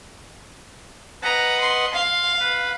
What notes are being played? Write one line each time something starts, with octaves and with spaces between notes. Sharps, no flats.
B4 D#5 F#5 A#5
C6
F5 C6
B4